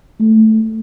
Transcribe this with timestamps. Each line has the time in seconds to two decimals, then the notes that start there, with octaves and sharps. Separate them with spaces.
0.20 A3